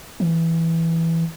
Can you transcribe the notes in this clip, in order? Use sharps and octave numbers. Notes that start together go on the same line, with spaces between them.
E3